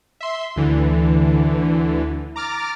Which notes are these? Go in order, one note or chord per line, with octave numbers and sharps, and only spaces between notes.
E5 C6
D2 D3 E3
A#5 D6 F6 A6